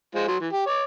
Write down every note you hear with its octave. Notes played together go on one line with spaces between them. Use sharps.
G#3 F4 C5
F#3 C6
E3
G4
C#5 D6